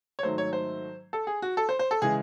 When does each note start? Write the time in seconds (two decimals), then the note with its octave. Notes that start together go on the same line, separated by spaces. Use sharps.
0.19 C#5
0.23 G#2 D#3 F#3 A3 C5
0.38 C#5
0.53 C5
1.13 A4
1.27 G#4
1.42 F#4
1.57 A4
1.69 C5
1.79 C5
1.91 A4
2.02 C#3 E3 G#3 G#4